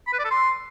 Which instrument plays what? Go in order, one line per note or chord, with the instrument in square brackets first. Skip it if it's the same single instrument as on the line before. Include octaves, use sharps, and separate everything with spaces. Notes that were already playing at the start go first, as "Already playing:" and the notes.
[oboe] B5
B4
D5
A4
C6